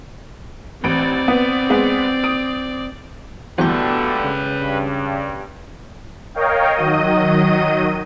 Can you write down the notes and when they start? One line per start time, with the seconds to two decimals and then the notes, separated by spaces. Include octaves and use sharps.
0.84 A1 C4 D5 D7
1.28 B3
1.70 G#3 B3
2.24 D#6 D7
3.59 E2 B2 D3 G3 A3 B4 G5 A#5
4.24 C#3
4.60 G2
6.35 A#4 C#5 D#5 F5 G5
6.74 D#3 F#3 D#5 D#7